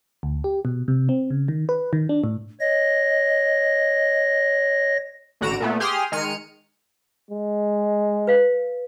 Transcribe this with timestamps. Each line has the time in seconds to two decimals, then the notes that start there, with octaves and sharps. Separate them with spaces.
0.23 D2
0.44 G4
0.65 B2
0.88 C3
1.09 C4
1.30 C#3
1.48 D#3
1.69 B4
1.93 D#3
2.09 D4
2.24 A2
2.60 C#5 D#5 A#6
5.41 A1 D3 F#4 A#5 D7 E7
5.60 A#2 A3 B3
5.80 G4 G#4 C6 D#6 F6
6.12 D#3 G#3 F6 C#7 D#7
7.30 G#3
8.27 B4 F5